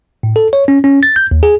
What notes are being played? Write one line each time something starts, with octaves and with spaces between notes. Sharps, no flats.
A2
A4
C#5
C#4
C#4
A6
G6
D#2
G#4